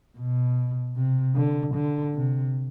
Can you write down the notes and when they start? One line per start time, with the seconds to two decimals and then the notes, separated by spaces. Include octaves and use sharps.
0.18 B2
0.96 C3
1.36 D3
1.75 D3
2.14 C3